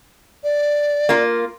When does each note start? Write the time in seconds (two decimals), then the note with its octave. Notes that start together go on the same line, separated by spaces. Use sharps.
0.44 D5
1.09 A#3 F4